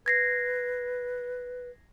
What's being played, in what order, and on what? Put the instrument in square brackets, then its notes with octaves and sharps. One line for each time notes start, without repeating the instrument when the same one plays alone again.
[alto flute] B4 [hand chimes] G#6 A#6 C7